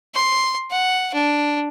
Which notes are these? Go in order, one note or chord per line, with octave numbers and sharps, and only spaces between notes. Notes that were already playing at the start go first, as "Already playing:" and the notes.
C6
F#5
D4